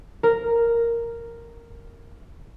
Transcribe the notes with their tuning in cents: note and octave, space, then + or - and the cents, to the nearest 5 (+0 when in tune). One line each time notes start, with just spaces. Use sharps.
A#4 -5